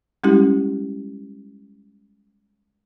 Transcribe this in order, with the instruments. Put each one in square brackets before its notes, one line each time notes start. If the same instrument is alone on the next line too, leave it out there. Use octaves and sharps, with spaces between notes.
[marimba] G3 G#3 C#4 E4 G4